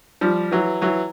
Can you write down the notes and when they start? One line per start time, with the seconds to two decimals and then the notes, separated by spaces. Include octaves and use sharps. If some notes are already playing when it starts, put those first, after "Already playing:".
0.21 F3 G3
0.51 E3 F#3
0.81 E3 F#3